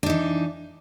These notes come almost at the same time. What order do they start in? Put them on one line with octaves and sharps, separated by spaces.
D4 D#4 E3